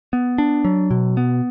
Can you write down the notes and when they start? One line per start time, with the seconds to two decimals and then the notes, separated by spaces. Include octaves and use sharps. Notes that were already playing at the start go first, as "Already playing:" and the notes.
0.13 B3
0.38 D4
0.65 F#3
0.91 B2
1.17 B3